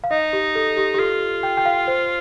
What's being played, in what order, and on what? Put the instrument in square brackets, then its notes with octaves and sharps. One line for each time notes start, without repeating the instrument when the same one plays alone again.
[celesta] F5
[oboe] D#4 [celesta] D#5
[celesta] G4
A4
G4
G4
[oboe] F4 [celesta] A4
[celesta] G5
G5
F5
C5